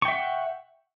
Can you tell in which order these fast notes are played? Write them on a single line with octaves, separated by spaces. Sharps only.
C#6 G5 E5 F#5